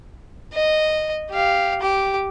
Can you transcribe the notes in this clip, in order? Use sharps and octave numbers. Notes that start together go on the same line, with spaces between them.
D#5
G4 F5
G4 D6